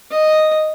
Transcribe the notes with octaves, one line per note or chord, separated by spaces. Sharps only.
D#5